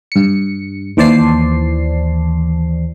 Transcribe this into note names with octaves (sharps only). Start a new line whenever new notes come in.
G2 C#7
D#2 E3 C5 D5 A5 C7